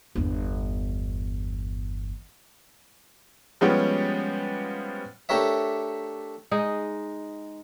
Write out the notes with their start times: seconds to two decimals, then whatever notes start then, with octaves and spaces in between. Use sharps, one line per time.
0.15 G1 E2
3.61 F3 G3 G#3 B3 C#4 G4
5.29 A3 D4 G4 A#4 C#5 E5
6.51 G#3 D#4